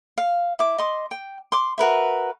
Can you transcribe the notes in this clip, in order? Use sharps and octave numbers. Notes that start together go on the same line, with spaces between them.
F5
E4 D6
D#5 C6 D6
G5
C6 D6
F#4 A#4 B4 E5